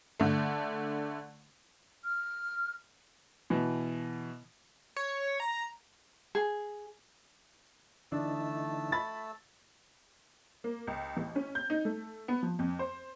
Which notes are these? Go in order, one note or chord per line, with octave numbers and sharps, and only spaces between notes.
D3 A3
F6
B2 E3
C#5
A#5
G#4
D3 E3 A3 D4 D#4 A5 E6
B5 A6
A#3
C#2
A1
C#4
G6
D#4
A3
B3
F3
F2
C5